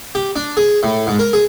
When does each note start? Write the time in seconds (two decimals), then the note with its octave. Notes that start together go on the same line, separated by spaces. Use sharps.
0.15 G4
0.36 D4
0.57 G#4
0.83 A2
1.07 G#2
1.19 A#4
1.33 G#4